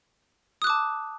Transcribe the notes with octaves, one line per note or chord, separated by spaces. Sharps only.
A5 D6 D#6 F#6